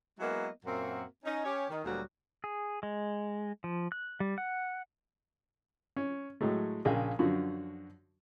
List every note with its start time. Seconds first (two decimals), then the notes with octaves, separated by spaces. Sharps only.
0.20 F#3 G#3 A#3 B3 E4 D#5
0.65 F#2 A#2 A#3 C4 F#4 E5
1.25 C#4 D#4
1.44 C#4 G4 C#5
1.70 D#3
1.84 D2 A#2 F#3 G3 B3 F#4
2.44 G#4
2.83 G#3
3.64 F3
3.92 F#6
4.20 G3
4.38 F#5
5.97 C#4
6.41 A2 F#3 G#3 A3
6.85 A#1 C#3 G#4 A#4 G5
7.19 F#2 D3 F3 F#4